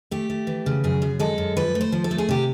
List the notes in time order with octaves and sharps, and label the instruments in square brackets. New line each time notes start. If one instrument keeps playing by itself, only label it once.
[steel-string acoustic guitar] A3 G4
A3
E3
C#3
F#2 G#4
F#2
G#3 A4
F#2
F3 B4
A3
C5
F3
A4
A3
G#4
C3 G4